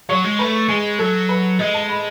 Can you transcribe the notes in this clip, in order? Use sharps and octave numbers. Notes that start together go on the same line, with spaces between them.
F#3 C#5
G#3
A3 B4
G#3 G#4
F#3 A4
B4
G#3 D#5
A5
B5